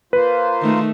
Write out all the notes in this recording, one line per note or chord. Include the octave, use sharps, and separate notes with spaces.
A#3 F4 B4 C5
D#3 A3